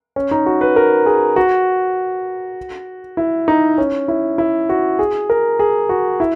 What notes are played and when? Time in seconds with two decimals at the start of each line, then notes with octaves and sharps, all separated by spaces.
0.16 C#4
0.31 D#4
0.46 F#4
0.61 B4
0.76 A#4
1.06 G#4
1.36 F#4
3.17 E4
3.48 D#4
3.78 C#4
4.08 E4
4.38 E4
4.69 F#4
4.99 G#4
5.30 A#4
5.59 G#4
5.89 F#4
6.20 E4